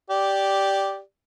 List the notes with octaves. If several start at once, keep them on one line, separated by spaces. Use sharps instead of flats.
G4 D5